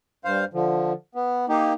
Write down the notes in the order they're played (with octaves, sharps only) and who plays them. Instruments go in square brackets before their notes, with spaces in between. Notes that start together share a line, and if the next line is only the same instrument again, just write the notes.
[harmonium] G2 C5 F5
D3 F3
B3
A#3 D#4 G4